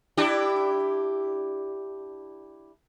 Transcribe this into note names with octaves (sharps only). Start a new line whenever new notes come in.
D4 E4 G4